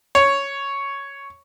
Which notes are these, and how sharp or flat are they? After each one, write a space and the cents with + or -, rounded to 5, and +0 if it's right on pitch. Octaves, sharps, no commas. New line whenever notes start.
C#5 +0